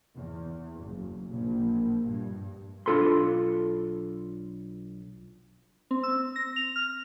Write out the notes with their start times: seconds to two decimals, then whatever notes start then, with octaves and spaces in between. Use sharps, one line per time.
0.16 E2
0.83 F#1
1.28 A#1
2.05 G2
2.86 B1 D4 F4 A4 B5 C6
5.91 C4
6.03 E6
6.36 A#6
6.56 F7
6.76 F6